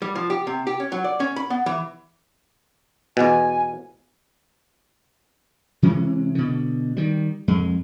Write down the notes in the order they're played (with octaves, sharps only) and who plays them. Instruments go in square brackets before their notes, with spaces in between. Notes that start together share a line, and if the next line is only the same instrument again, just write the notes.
[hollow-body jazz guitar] G3
F3
G4
C3
G4
C#4
F#3
D5
C#4
B5
B3
E3
[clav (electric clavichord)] E2 B2 [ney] G#5
[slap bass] C3 E3 G#3 C#4
B2 D3
D#3 G3
F2 G#3